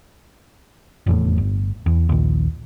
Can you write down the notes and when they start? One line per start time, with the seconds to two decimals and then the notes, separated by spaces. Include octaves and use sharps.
1.06 F1 E2 A2
1.38 G1
1.86 E2
2.09 A#1 D#2